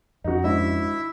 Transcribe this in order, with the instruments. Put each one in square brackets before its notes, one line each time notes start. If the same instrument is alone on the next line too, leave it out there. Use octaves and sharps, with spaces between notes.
[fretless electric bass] F2 C#4 [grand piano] D#4 F#4
[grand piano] G#1 D4 D#5 [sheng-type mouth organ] E4 E5